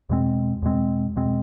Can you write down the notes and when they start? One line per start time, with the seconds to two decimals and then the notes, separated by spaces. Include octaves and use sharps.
0.09 E2 B2 G#3 C4
0.62 E2 B2 G#3 C4
1.16 E2 B2 G#3 C4